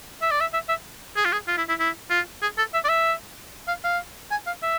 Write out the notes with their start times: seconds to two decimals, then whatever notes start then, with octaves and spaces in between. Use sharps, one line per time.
0.22 E5
0.31 D5
0.41 E5
0.53 E5
0.69 E5
1.16 G#4
1.25 F4
1.32 G#4
1.48 F4
1.58 E4
1.69 E4
1.80 E4
2.10 F4
2.42 G#4
2.58 A4
2.74 E5
2.84 D5
2.89 E5
3.68 F5
3.84 F5
4.31 G#5
4.47 F5
4.63 E5